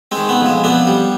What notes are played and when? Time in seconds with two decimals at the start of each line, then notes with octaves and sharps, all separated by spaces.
0.12 G#3 C4
0.17 D#3
0.29 B3
0.41 F2
0.46 G#3
0.64 F2 B3 D4
0.87 G3